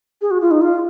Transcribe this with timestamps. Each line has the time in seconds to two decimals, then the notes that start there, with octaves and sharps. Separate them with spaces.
0.21 G#4
0.31 F#4
0.41 F4
0.51 D#4
0.61 F4